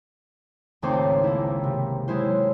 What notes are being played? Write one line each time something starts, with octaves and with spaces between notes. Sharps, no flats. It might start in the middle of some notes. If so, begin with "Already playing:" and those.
G#1 C#2 A3 C4 C5 D6
A#3 E4
C3
F#3 G#3 E4 C5